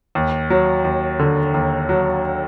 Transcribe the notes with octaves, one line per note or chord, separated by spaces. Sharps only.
D#2
F#3
D#2
D3
D#2
F#3